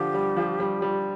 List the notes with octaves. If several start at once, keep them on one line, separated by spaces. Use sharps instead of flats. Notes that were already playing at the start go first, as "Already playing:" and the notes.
Already playing: D3 F3 G4
G3
F3
G3
G3